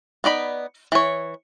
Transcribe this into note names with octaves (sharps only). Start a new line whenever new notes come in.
B3 D#4 D5 B5
E3 C#5